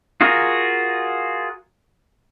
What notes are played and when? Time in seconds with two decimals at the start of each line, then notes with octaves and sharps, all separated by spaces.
0.21 F4 F#4 G#4 A#4